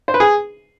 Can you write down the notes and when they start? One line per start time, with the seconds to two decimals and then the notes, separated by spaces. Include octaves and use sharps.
0.08 C5
0.14 B4
0.20 G#4